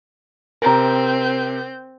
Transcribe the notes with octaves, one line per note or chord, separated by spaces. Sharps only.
C3 C4 A#4 G#5 A#5 G6